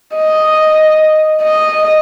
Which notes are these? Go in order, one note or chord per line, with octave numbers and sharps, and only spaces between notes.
D#5
D#5